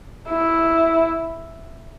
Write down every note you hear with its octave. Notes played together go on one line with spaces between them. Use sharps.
E4